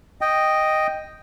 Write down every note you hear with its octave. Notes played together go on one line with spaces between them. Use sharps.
D#5 G5